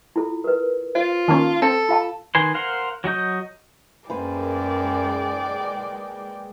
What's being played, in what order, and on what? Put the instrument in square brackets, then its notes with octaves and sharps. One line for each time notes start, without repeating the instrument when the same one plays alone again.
[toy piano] E4 F4 A4
A#4 B4
[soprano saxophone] F4 [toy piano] C5
[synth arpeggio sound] D#3 A#3 C#4 [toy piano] A5 D#6
[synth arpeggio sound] C4 [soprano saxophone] A4
[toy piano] F4 F5 A5
[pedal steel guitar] D#3 B4 G#5 C6
A#4 C5 F5 F#5 C6
F#3 F#4 D#5 G6
[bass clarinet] F#2 [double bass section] G#3 [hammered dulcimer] A#3 B4 C5 [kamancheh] D5 G5